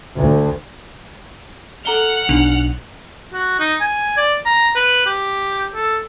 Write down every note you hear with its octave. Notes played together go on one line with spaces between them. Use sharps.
D2
A4 F#5 A#5 F6 G7
B1 D4
F#4
D#4
G#5
D5
A#5
B4
G4
A4